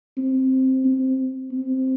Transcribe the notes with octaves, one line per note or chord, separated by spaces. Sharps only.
C4
C4
C4